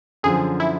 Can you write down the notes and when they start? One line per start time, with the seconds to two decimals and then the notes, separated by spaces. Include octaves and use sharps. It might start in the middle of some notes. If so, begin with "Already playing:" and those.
0.23 F#2 D3 F3 G#4
0.60 E4